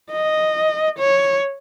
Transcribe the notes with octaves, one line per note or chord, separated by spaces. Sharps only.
D#5
C#5